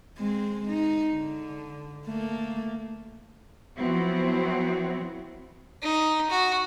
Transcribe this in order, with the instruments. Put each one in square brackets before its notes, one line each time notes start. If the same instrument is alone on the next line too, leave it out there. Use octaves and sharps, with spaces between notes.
[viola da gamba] G#3 C4
D#4
D3
A3 A#3
[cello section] F3 F#3 B3 C4 E4 F#4
[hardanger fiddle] D#4
F#4